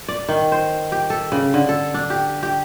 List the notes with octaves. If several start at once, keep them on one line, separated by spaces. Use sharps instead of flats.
D5
D#3
C5
G4
A4
C#3
D3
A4
D4
G4
G4